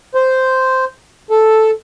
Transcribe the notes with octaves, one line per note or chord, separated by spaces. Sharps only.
C5
A4